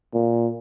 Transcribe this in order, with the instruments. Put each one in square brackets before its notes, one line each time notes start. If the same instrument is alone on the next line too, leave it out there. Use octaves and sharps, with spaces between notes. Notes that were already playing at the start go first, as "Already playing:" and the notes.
[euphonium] A#2